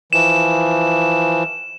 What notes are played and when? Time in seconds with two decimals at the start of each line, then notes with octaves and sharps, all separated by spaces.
0.13 E3 F3 E7